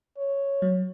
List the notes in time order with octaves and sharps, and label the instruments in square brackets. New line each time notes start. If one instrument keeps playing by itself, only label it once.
[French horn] C#5
[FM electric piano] F#3